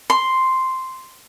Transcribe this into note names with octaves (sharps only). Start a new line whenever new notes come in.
C6